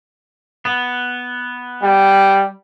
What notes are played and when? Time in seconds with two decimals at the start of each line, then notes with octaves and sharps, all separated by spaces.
0.65 B3
1.83 G3